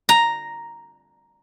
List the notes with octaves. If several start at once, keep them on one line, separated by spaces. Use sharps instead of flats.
A#5